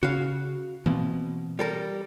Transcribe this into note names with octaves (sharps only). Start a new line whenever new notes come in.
C#3 F#4 F5
B2 E3 A#3 C4
G3 A4 A#4